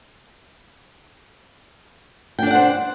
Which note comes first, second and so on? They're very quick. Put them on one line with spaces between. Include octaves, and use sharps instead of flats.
G5 D4 D5 F#5 C5